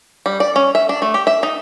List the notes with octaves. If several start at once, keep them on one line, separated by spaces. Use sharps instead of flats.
G3
D5
C#4
E5
D4
A3
G4
E5
D#4